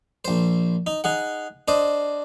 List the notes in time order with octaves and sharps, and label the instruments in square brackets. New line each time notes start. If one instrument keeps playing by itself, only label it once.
[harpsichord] A#1 C5
D#4
D#4 G#4 F#5
D4 C5 D#5